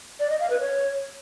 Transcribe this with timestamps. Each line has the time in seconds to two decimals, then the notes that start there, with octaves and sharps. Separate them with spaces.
0.20 D5
0.30 D#5
0.40 F5
0.50 B4
0.60 C#5